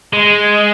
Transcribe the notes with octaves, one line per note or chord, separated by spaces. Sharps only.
G#3